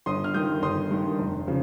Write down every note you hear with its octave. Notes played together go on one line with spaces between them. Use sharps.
G1 C6 D#6
F6
G2 D#3 D#6 G6
G1 C6 D#6
G2 D#3
F1
C#3 F3